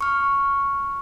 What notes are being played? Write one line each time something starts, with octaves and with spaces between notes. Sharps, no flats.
C#6 F6